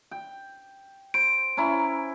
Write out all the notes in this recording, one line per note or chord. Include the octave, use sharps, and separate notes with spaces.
G5
C5 D7
C#4 E4 A#5